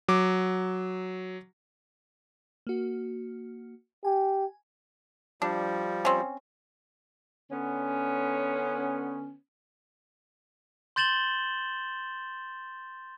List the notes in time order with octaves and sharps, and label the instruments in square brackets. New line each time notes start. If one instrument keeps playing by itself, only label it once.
[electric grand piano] F#3 D6
[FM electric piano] A#3 F#4
[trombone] G4 [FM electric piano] G#5
[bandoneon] F3 G3 [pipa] D4
[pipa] C4 C#4
[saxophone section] D3 B3 C#4
[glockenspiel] C6 G6 A6 E7 F#7 G7